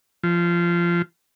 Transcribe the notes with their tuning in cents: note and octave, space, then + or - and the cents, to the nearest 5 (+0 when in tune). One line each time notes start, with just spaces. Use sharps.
F3 -20